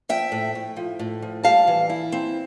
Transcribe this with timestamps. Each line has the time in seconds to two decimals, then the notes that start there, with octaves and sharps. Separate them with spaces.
0.09 F3 E5 G5
0.32 A2
0.55 A2
0.77 F3
0.99 A2
1.22 F3
1.44 G3 F5 A5
1.67 E3
1.90 E4
2.12 C4